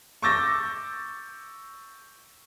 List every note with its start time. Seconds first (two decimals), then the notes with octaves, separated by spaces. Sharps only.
0.22 C#6 D6 E6 G6 A6 A#6